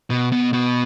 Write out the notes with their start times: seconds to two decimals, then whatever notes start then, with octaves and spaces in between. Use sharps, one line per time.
0.10 B2
0.32 B2
0.53 B2